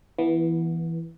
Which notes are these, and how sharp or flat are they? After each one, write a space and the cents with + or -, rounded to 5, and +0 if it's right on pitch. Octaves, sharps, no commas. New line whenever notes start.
E3 +5 B3 -20